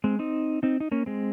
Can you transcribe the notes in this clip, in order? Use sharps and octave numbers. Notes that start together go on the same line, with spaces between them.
G#3 C4
C4 D#4
C4 D#4
D#4
A#3 C#4
G#3 C4